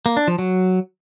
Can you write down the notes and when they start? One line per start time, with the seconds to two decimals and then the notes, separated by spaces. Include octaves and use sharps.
0.06 A#3
0.17 D4
0.28 F3
0.39 F#3